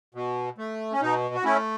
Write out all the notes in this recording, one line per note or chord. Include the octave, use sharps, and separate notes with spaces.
B2
A3
C#4
B2 D#4
F#4
A3 C#4 E4